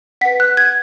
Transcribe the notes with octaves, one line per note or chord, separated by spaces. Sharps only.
B4 F#5 B6
F#6
G#6